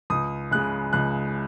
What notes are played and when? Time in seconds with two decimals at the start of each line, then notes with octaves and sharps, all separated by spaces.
0.10 C#2 D#6
0.51 C#3 G#3 F#6
0.93 C#2 F#6